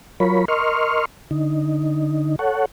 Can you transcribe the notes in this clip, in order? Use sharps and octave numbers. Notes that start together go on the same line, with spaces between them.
F#3 F4 A#4 C#5 B5
A#4 D#5 C6 C#6 F6
D3 D#4
A4 C#5 F#5